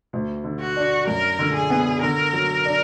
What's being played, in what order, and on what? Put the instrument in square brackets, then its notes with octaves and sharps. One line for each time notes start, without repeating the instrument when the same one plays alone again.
[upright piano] D2
D3
[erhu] F#4
[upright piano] D4
[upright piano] F#2 [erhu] A#4
[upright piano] D3
[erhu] G#4
[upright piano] B3
[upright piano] D3 [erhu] A#4
[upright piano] F#3
D4